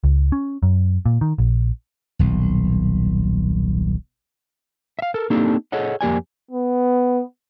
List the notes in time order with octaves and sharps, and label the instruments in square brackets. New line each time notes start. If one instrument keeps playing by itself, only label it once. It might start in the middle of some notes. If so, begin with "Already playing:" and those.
[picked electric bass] C#2
C#4
F#2
A#2
D#3
A#1
[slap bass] D#1 B1
[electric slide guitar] E5 F5
A4 A#4
A#3 C4 D4 D#4 G4 A4
G#4 A4 C#5 D#5 F#5
F2 A#3 G4 D5 G#5
[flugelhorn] B3